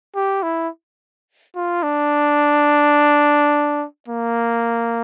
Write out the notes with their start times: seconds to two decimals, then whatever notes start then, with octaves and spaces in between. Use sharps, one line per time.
0.16 G4
0.43 E4
1.56 F4
1.83 D4
4.08 A#3